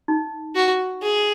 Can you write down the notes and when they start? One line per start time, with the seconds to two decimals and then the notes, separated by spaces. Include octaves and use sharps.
0.08 D#4
0.55 F#4
1.02 G#4